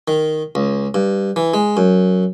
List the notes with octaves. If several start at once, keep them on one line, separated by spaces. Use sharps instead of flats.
D#3
C#2
G2
E3
G#3
F#2